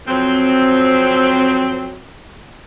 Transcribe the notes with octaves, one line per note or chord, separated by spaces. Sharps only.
F2 F#3 C4